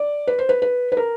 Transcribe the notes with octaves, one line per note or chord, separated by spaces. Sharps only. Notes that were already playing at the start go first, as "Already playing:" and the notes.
Already playing: D5
B4
C5
B4
B4
B4
A#4